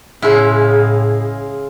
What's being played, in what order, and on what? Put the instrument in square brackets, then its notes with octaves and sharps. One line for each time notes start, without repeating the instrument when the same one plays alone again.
[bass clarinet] A2 [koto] C#3 E4 [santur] G#3 F5 [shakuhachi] G#4